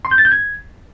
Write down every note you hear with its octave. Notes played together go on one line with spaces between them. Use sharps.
C6
G6
A6
G6
G#6